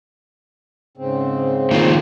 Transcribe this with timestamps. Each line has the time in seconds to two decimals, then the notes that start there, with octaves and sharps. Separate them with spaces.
0.97 G#2 C#3 C4
1.71 D#3 F3 A#3